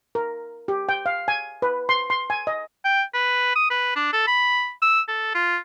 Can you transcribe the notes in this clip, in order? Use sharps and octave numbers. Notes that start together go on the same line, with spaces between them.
A#4
G4
G5
F5
G#5
B4
C6
C6
G#5
D#5
G5
B4
D#6
B4
D4
A4
B5
E6
A4
F4